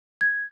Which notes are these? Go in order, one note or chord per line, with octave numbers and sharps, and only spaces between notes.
G#6